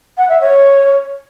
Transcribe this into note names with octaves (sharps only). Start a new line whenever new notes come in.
F#5
E5
C#5